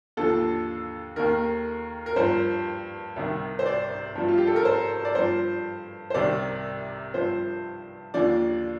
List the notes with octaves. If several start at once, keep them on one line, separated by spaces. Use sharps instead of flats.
D#2 D3 F3 A4
D#2 D#3 A#4
A#4
G2 F3 C5
C2 C3 D#3
C5
D5
G2 F3
F4
G4
A4
A#4
C5
D5
G2 F3 C5
C5
C2 C3 D#3 D5
G2 F3 C5
D#2 D3 F3 D5